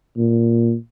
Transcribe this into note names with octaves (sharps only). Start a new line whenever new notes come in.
A#2